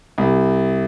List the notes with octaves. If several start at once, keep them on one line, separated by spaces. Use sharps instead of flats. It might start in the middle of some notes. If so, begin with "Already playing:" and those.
C2